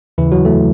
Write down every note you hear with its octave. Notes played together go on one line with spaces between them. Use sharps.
D#2 C#3 E3 E4
F#3 F#4
A3 A4